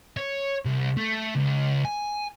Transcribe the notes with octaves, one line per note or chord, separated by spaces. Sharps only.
C#5
C2
A3
C#2
G#5